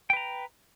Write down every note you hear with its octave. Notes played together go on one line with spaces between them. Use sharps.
B4 G5 A#5